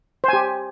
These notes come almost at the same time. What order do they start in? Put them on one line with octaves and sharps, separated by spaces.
C5 G#5 G4